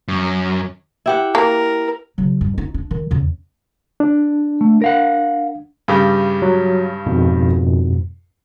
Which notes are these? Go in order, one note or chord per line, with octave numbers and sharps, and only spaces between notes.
F#2
E4 G4 F#5
A#3 A#4
C#3 F#3
G2
D#4
D4
D#3
E2 C#3
D4
A3
A#4 F5 F#5
G2 C#3 G4
F#3
F2 G#2 B2